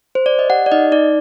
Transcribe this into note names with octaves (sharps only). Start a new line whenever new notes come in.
C5
D5
D#5
G4 F#5
D5
D#4 D#5
D#4 D5